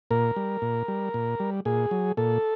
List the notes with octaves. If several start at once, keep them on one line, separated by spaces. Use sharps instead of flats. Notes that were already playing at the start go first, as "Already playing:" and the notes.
A#2 A#4
G3
A#2
G3
A#2
G3
A#2 G#4
F#3
A#2 A4